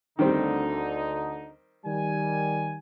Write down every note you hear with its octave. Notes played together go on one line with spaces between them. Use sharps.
D2 D3 D#3 G3 C4 D#4
D#3 G3 G#5